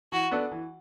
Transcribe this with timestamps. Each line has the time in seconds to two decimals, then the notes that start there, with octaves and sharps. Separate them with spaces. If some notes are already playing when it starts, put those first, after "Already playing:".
0.12 E3 F#4
0.31 B3 D4 A4 D5
0.51 E3